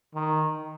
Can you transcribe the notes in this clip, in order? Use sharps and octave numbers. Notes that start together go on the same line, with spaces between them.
D#3